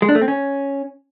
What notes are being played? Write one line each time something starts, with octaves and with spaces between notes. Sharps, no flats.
G#3
D4
A3
C4
C#4